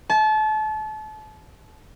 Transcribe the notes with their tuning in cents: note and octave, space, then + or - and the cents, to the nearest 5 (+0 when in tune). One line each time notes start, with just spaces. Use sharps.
A5 -30